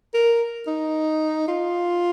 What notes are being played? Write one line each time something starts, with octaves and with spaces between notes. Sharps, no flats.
A#4
D#4
F4